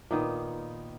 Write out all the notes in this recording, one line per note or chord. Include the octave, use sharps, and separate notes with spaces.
A#2 D#3 B3